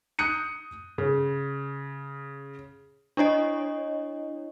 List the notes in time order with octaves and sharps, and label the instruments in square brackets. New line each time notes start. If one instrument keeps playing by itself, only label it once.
[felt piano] D#6 F#6 G6 C#7 D#7
C#3
[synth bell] D4 E4 C#5 D#5